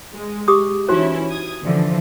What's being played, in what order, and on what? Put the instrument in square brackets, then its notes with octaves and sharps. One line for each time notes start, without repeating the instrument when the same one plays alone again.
[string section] G#3
[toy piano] G4 D6 D#6
[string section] E3 C#4 E4 [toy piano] D#4 F#4 C5
[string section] D#6 G#6
D3 E3 F3